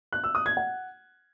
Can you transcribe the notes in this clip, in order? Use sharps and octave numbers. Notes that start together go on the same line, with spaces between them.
F#6
E6
D#6
G#6
F#5